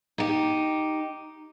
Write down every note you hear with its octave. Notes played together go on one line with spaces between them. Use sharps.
D#4 G4